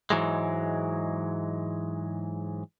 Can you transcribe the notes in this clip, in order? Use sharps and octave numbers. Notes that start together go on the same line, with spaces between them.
G#2 E3 F#3 G#3